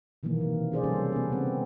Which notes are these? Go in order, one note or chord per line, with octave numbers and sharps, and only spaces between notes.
B2 D#3 E3 F#3 A#3
C3 F#3
C#4 G#4 C5 D5
C3 F3 G3 C#4 A4 C5
B3 C#4 B4
C#3 G#3 C4